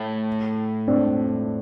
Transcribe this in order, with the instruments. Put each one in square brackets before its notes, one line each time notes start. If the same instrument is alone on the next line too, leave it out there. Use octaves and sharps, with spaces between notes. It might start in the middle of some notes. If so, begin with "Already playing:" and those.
Already playing: [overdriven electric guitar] A2
[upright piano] C4 D4